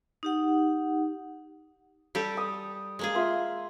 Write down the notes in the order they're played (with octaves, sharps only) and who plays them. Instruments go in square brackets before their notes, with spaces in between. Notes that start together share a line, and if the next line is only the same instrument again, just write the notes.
[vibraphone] D#4 G4 F#5
[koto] G3 G4 A4
[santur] D#6
[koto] G#3 A#3 G#4
[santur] F4 E5 C6